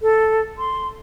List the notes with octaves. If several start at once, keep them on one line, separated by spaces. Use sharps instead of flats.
A4
C6